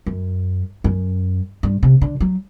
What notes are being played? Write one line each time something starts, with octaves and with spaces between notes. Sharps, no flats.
F#2
F#2
G2
C3
D3
F#3